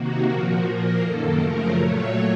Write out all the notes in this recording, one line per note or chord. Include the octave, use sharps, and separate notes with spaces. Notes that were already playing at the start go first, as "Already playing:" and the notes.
Already playing: C3 D#3 A#3 F#4
A#2 F3 A#3 F#4
A#2 F3 A#3 A#4
F#2 D#3 A#3 A4
F#2 C#3 F3 A3 A#4
A#2 F#3 A3 C#5